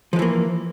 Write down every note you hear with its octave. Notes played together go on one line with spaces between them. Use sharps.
E3 F3 G#3 A#3